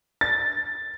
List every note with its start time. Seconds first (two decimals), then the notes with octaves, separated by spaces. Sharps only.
0.21 A6